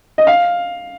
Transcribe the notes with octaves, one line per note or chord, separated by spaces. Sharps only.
D#5
F5